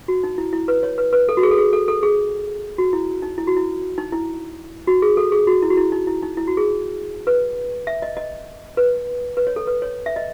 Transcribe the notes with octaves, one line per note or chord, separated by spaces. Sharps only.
F#4
D#4
E4
E4
B4
C#5
B4
B4
A4
F#4
G#4
A4
G#4
A4
A4
G#4
F#4
E4
D#4
E4
F#4
E4
D#4
E4
F#4
G#4
A4
G#4
F#4
E4
F#4
E4
D#4
E4
D#4
E4
F#4
G#4
B4
E5
D#5
D#5
B4
B4
C#5
A4
B4
C#5
E5
D#5